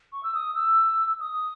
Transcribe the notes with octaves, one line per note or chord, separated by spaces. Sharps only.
C#6
E6
D#6
E6
D#6